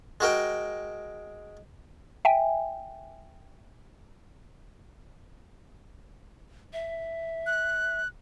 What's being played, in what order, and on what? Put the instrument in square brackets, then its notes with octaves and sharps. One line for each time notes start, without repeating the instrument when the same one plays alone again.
[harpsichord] G#3 F#4 A#4 G5
[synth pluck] E5 G5 G#5
[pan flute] E5
[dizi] F#6